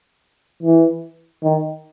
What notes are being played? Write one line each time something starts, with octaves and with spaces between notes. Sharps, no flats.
E3
D#3